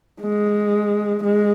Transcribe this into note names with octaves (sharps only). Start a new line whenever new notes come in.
G#3
G#3